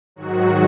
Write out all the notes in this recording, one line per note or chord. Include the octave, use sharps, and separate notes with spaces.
G#2 D#3 F#3 F#4